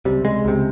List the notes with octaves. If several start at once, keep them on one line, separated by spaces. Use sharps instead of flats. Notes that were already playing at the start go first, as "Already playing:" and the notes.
C#2 C3 G3
G#3
C#2 C3